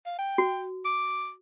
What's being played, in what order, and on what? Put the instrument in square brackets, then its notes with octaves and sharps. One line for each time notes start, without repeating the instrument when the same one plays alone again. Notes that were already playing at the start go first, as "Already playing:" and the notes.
[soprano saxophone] F5
G5
[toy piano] F#4
[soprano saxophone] D6